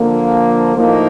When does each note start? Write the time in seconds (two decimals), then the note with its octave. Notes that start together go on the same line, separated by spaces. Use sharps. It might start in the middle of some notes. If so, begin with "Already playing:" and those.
Already playing: D3 F3 A#3
0.74 A2 F3 A#3 D#4